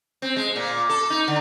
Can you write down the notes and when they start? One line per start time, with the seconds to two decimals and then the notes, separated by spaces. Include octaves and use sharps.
0.22 C4
0.36 G#3
0.56 A#2
0.89 A4
1.10 D#4
1.28 D3